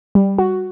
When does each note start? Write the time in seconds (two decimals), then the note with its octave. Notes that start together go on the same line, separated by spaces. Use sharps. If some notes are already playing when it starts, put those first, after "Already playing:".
0.15 G3
0.38 F#4